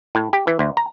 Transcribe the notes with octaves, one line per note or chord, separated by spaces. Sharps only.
A2
G4
E3
D2
A#5